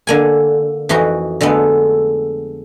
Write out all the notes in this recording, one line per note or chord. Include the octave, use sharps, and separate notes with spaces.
D3 A#3 G#5
F2 E3 D#4 F#4
D3 G#3 A3 B3